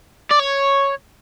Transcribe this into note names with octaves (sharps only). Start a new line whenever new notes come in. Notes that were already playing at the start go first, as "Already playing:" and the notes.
D5
C#5